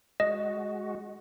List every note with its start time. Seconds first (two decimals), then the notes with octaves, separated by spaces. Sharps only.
0.20 G#3 F#4 D#5